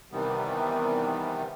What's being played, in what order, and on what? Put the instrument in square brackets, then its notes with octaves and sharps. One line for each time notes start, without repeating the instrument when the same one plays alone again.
[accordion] C3 D#3 E3 G3 B3